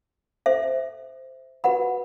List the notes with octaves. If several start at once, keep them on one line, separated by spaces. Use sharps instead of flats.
A4 C5 E5
F#4 B4 F#5 B5